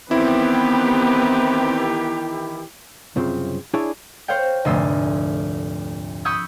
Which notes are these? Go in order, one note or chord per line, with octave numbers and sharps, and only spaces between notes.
D#3 E3 B3 C4 E4 G4 B4
C2 F#2 C#3 C4 F4
D4 E4 G#4 C#5 D5 G#5
C5 C#5 F5 G5
F1 D2 G#2 A3 C6 E6
B5 C#6 D#6 E6 G6 G#6